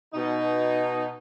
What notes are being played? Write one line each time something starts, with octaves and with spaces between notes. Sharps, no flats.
B2 D#4